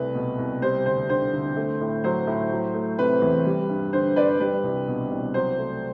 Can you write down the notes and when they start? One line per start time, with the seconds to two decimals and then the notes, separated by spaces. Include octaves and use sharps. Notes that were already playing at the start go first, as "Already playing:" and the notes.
Already playing: C2 A3 B4
0.15 B2
0.39 C2
0.62 G3 C5
0.86 D2 C5
1.09 D3 C5
1.33 D2
1.57 A3
1.81 A2
2.04 F#3 C5
2.27 A2
2.51 F#3
2.74 A3
2.98 C3 B4
3.22 E2
3.45 G3
3.69 G2
3.93 D3 C5
4.16 G2 B4 D5
4.40 G3 B4
4.63 C2
4.88 B2
5.11 C2
5.34 F#3 C5
5.59 A3